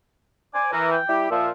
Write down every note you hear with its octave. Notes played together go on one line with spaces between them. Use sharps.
C5 D5 G#5
E3 A#4
G5
G3 E4 G4
A#2 F3 E5